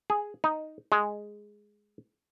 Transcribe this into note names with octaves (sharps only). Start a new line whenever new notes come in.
G#4
D#4
G#3